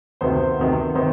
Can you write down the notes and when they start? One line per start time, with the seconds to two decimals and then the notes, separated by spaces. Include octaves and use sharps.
0.21 D2 C3 D#3 B3 C5
0.59 D2 C3 D#3 B3
0.95 C3 D#3 B3 C5